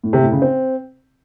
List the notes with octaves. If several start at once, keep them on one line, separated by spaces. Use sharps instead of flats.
A2
C3
A2
C#3
C4